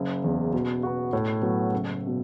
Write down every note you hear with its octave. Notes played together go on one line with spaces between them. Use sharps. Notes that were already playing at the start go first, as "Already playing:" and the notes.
Already playing: F#1
E2 C#3
B2
B3 F#4
A2
F#3 B3 F#4
F#1
B2